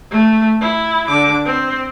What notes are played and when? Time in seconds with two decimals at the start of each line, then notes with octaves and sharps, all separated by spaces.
0.11 A3
0.61 E4
1.07 D3 D6
1.45 C4